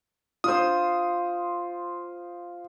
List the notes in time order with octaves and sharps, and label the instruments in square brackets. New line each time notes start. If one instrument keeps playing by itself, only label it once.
[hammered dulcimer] F4 C5 [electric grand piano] D#6